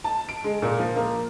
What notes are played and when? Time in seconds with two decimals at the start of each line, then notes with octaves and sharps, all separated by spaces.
0.04 A5
0.29 D7
0.44 G#3
0.62 A#2
0.79 F3
0.96 A#3